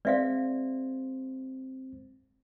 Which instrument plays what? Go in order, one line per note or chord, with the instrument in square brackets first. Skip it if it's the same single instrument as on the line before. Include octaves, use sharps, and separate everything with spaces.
[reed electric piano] G#3 C4 C5 [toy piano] D5 E5 F5